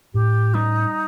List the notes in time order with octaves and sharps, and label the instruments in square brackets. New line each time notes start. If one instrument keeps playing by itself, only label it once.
[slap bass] A2 [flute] G4
[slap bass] G3 [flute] D#4